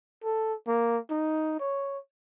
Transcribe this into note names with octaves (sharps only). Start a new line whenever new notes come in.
A4
A#3
D#4
C#5